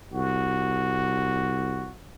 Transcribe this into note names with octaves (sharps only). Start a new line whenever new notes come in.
C2 F#4